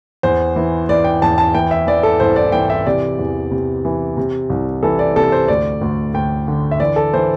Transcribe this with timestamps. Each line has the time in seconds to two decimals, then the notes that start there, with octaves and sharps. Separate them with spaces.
0.23 E2 C5
0.56 E3
0.89 E3 D5
1.04 G5
1.22 E2 A5
1.38 A5
1.55 E3 G5
1.71 E5
1.87 E3 D5
2.03 A4
2.20 C2 C5
2.36 D5
2.52 E3 G5
2.70 E5
2.86 C3 D5
3.18 E2
3.51 C3
3.85 E3
4.17 C3
4.50 C2
4.83 E3 A4
4.99 D5
5.16 C3 A4
5.32 C5
5.48 D2 D5
5.81 D2
6.14 D2 G5
6.48 D3
6.71 E5
6.80 E3 D5
6.96 A4
7.13 E3 C5